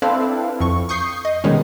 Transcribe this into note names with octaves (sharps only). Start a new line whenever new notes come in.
C4 D4 E4 A4 B4 F5
F2 C#6
C#6 D#6 G6 C7
D#5
B2 D#3 G3 G#3 C#4